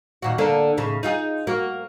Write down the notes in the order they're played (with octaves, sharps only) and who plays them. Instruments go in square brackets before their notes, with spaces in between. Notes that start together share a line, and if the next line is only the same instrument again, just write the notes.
[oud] D#2 A#2 F#4
D3 A#3 D4
D#2 A2 C#3
D#4 F4 G#4
A#3 F#4